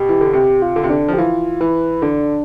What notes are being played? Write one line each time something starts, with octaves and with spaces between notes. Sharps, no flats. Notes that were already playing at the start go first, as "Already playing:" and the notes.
Already playing: B2 G4
E3
D3
C3 G4
F4
D3
C3
D3 D4
F3
G4
E3 F4
E3 B4
D3 D4